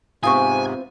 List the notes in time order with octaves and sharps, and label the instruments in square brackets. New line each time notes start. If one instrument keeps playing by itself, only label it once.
[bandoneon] G#2 C3 [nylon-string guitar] B3 C4 F4 [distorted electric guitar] G#5 [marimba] C#6 D#6